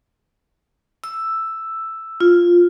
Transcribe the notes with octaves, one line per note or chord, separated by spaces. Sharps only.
E6
F4